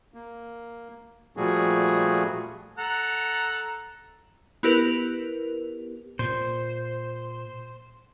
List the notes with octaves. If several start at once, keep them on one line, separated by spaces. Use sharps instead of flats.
A#3
A#2 F3 G3 A3 F#4 G#4
A4 F#5 A#5
B3 E4 G4 A#4 B4 F7
A#2 C5